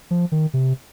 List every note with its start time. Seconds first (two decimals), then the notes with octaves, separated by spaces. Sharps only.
0.11 F3
0.32 D#3
0.54 C3